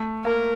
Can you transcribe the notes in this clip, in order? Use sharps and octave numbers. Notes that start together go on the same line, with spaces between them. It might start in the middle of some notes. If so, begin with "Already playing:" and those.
Already playing: A3
A#3 A#4